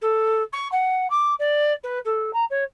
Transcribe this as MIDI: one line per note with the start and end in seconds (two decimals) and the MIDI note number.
0.01 0.42 69
0.52 0.70 85
0.72 1.09 78
1.10 1.34 86
1.39 1.73 74
1.83 1.99 71
2.05 2.31 69
2.33 2.44 82
2.50 2.64 73